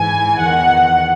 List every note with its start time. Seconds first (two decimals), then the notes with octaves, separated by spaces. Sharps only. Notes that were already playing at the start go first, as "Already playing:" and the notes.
Already playing: G#2 E3 G#5
0.40 E2 D#3 F#5